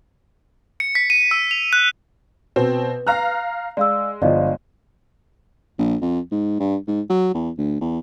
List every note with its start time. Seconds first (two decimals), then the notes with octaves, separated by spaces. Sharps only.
0.80 C#7
0.95 B6
1.10 D#7
1.31 E6
1.51 F7
1.73 F#6
2.56 B2 C4 B4
3.07 F5 A#5 F6 F#6
3.77 G#3 D5 F5 E6
4.22 G1 F3 D5 D#5 F5
5.79 A#1
6.02 F2
6.32 G#2
6.60 G2
6.88 G#2
7.10 F#3
7.34 E2
7.58 D2
7.81 E2